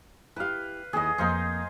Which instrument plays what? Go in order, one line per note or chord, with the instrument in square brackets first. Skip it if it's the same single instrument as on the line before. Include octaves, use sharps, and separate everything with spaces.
[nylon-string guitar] E4 G4 [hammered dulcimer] B4 F5
[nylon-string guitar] D#2 E4 [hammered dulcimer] G#4 D#5
[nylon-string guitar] F2 A#3 [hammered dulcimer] D#4 C5 F5